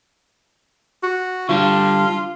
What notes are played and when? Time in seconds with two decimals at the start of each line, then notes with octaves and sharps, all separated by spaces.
1.03 F#4
1.49 D3 G3 D4 F4